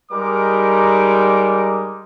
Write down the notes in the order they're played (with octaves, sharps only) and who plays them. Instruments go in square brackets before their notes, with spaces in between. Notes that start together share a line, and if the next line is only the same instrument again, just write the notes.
[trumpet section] G3 G#3 D#4 A#4 D6